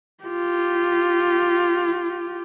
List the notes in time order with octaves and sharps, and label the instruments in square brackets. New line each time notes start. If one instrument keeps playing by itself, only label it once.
[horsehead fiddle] F4 G4